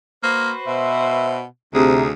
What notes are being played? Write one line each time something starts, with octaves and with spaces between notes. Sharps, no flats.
A#3 F#4 B4 C5
B2 E5
D2 C3 D#4 G#4